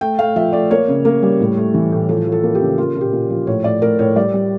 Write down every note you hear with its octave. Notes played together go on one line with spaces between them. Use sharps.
A3 G5
A3 F5
F3 E5
A3 D5
A#3 C#5
C#3
A#3
G3
A2
A3
E3
A2
F3 A4
F3
A4
A#3
G4
C#3
A#3 F4
A#2
G4
A#2
F3
A2 C#5
A2 D5
A2 A#4
A2 C#5
G3 D5
G3